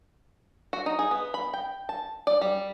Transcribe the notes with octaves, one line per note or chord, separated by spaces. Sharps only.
F#4
D#4
G#4
B3
B5
G5
A5
D5
G3